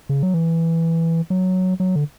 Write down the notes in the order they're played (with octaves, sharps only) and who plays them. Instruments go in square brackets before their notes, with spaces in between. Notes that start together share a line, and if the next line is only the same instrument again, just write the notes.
[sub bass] C#3
F#3
E3
F#3
F#3
D3